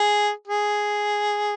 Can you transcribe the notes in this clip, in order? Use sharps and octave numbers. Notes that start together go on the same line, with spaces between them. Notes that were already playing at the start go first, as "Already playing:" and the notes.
Already playing: G#4
G#4